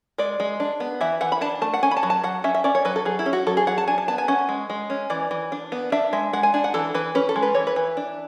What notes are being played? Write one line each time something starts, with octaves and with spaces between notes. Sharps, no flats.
G#3 D5
G#3
D4
B3
E3 E5
E3 F#5
B5
D4 A5
A3 A5
F#5
C#4 G#5
B5
A5
F#3
A5
F#3 F#5
C#4 E5
E5
C#4 D5
C#5
F#3 B4
A4
F#3 G#4
E4
C#4
F#4
F#3 A4
G#4
F#3 F#5
A5
D4 G#5
A5
B3 A5
G#5
C#4 F#5
G#3
G#3
C#4
E3 D5
E3
D4
B3
D4 E5
G#3 E5
G#3 F#5
G#5
D4 G#5
F#5
E3 A4
E3 B4
C#4 B4
A4
G#3
B4
E3 C#5
B4
E3
D4